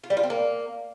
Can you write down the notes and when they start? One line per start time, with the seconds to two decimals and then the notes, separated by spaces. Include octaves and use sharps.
0.04 F4
0.10 G3
0.17 F4
0.23 C4
0.30 A#3